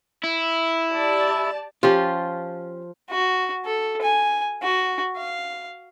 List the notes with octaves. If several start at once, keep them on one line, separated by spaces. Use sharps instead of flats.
E4
G4 D5 A5
F3 C#4 F4 G4
F#4
A4
G#5
F#4
F5